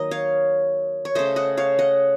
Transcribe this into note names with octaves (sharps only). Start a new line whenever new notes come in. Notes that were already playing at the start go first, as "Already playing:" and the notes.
Already playing: D#3 F#3 A#3 D#5
C#5 F5
C#5
C#3 A3 C5 D#5
D#5 F#5
C#5 F5
D#5 F#5